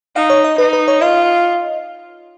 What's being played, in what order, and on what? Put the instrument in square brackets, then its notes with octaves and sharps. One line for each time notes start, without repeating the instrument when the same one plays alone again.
[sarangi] D#4 [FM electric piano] F5
[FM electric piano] C#5
D#5
[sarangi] D#4 [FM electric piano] B4
[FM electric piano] B4
C#5
[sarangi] F4 [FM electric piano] D#5